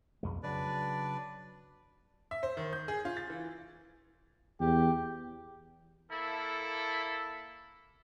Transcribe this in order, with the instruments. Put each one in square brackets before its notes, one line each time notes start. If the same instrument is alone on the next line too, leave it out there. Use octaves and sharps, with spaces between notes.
[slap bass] B1 F2 G#3
[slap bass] C#3 F#3 [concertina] D4 B4 D5
[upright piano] E5
C5
D#3
G6
G#4
F4
A6
E3
[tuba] E2 [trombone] G4
[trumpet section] A#3 E4 A4